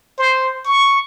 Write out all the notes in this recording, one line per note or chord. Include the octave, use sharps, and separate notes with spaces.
C5
C#6